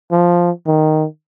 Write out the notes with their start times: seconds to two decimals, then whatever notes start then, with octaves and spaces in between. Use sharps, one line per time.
0.12 F3
0.67 D#3